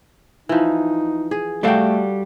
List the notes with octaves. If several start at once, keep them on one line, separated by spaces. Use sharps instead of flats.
E3 F3 D#4
G#4
G3 A3 F#4 A4 F5 G5